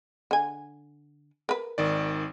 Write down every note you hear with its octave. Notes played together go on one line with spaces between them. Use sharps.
D3 G#5
A#4 B4
G#1 D#3 D5